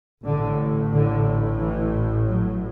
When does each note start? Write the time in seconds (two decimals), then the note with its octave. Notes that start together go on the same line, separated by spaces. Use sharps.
0.25 A1 A2 D3
0.92 D3
1.60 E3
2.26 F#3